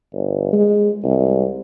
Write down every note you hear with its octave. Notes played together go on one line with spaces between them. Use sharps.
G1
G#3
C2